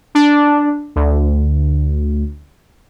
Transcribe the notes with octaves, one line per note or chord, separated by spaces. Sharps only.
D4
D2